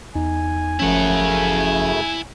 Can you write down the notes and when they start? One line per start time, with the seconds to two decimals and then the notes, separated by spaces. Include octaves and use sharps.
0.15 E2 D#4 G#5
0.80 G1 F#2 C#3 F3 A3 C#4 E4 F#5